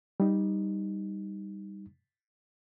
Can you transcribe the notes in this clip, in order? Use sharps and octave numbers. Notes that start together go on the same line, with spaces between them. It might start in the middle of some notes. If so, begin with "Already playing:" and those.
G3 D#4